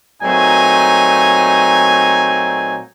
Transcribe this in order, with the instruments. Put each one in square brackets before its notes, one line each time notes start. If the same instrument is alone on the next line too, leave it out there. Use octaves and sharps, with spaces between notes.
[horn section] A#2 F#3 A3 C4 D#4 G#5